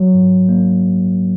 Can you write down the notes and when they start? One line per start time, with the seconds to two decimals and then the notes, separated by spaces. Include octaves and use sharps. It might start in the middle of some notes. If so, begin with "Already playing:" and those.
Already playing: F#3
0.14 G#2
0.49 A#3